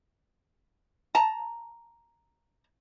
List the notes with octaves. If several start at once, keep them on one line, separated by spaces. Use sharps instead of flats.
A5 A#5